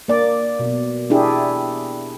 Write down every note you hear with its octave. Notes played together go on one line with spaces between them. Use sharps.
A#3 D5
B2
D4 E4 G4 G#4